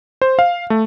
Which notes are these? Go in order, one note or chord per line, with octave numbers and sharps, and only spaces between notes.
C5
F5
A3